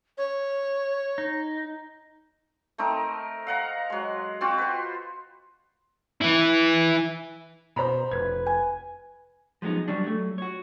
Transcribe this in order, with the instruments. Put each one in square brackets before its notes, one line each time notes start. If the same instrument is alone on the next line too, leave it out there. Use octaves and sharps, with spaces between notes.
[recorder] C#5
[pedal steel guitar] D#4
[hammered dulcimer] A3 C4 D#4 A#4
F5 F#5 A#5
F#3 G#3
C4 F4 F#4
B4 C5
[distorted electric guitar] E3 E4
[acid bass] B2 [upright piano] C5 A#5 B5
[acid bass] F1 [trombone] B4 [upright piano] G#6
[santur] G#5
[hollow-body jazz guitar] F3 F#3 G#3 B3 D#4
F#3 G3 D4
F#3 A3
F#4 C#5